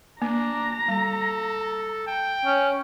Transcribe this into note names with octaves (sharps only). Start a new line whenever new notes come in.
A#3 D4 A#5
G3 A4
G5
C#4